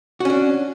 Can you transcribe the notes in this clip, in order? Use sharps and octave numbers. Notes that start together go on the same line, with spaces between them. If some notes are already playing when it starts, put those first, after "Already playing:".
C#4 D4 F#4